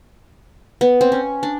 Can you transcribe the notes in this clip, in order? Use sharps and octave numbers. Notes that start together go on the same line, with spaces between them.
B3
C4
C#4
D4